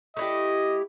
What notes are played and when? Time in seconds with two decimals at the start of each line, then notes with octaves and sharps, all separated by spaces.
0.17 A3 E4 G4 D#5